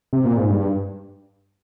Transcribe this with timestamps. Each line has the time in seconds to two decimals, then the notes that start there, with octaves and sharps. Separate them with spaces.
0.13 C3
0.25 A#2
0.37 G#2
0.50 G2